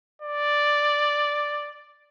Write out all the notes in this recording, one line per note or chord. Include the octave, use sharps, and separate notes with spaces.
D5